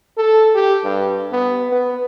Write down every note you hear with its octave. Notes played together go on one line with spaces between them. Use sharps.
A4
G4
G2
B3
B3